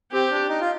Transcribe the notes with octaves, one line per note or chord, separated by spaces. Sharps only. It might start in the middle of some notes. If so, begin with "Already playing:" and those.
C4 G4
D4
D#4
F4